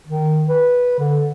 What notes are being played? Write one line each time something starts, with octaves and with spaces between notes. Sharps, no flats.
D#3
B4
D3